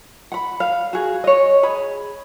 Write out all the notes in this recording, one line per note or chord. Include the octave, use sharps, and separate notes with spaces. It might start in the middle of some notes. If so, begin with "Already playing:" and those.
F#5 B5
F5
F#4 G#4
C#5 D#5
G#4 B5